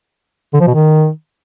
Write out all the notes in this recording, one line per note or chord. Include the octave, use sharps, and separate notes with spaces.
D3
F3
B2
D#3